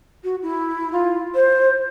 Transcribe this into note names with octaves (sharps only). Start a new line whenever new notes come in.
F#4
E4
F4
C5